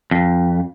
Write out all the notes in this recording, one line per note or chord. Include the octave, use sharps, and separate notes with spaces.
F2